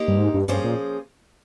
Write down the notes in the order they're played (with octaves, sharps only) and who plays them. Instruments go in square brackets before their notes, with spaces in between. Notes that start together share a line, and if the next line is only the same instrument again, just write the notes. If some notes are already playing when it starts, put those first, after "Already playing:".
Already playing: [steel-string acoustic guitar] A#3 D#4 G4 C5
[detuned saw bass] G2
G#2
G2
[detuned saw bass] G2 [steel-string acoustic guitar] F3 A#3 C#4 G#4 C5
[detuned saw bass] A#2